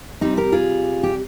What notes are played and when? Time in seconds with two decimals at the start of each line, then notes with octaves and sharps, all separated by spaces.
0.21 C3 G3 C4 D#4
0.37 G4 A#4
0.52 F4 G#4
1.03 G4